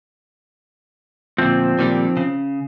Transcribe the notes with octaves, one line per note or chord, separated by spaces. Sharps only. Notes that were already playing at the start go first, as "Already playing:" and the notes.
D2 A#2 F3 C4
A#2 D#3 G3
C#3